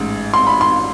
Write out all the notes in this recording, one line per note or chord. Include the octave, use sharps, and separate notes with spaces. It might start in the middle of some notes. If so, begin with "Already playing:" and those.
Already playing: A1 G#2
C6
B5
C6